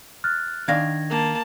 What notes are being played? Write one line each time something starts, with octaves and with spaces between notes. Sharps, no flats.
F6 F#6 A6
D#3 D4 F5 G#6 A#6
A#3 A5